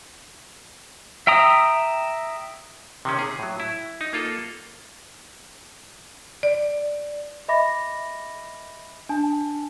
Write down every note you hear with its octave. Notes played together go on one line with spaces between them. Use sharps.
E5 G5 A#5 D#6
C3 D#3 C#4
G#4
A2 F#3
E4
D#4
A#3 F4 A4
D5
D#5 E5 B5 D6 A#6
D4 G#5 A5